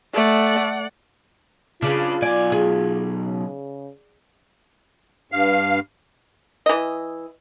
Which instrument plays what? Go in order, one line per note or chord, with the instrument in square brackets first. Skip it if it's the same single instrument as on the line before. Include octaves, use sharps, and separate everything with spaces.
[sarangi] A3 [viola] D5 F#5
[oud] C#3 [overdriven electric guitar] D4 B4 [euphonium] F4
[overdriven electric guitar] B1 G#5 [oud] D5
[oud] G#4
[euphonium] C#3
[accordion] G2 F5
[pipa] E3 D#5